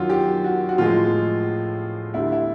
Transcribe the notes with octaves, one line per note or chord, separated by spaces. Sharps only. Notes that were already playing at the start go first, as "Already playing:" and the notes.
Already playing: F#2 D#3 F#3 F4 F#4
G4
F#4
F#4
A2 F3 G#3 F4
D2 D3 G3 E4
E4